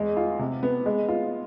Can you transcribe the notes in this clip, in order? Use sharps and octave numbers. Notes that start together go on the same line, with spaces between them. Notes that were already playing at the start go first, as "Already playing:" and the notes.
Already playing: E2 G#3
F4
C3
B3
G#3
F4